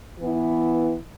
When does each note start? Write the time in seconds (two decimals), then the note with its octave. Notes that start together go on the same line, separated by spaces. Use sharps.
0.19 E3 B3 E4